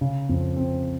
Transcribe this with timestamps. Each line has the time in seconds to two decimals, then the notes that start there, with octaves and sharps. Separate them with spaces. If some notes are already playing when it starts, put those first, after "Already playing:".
0.01 C#3
0.29 F2
0.57 C4